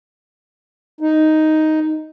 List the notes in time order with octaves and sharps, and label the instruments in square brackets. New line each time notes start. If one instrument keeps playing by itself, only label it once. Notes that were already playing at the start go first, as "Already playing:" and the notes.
[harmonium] D#4